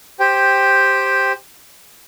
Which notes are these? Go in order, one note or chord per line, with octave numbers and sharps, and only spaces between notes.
G4 C5 G5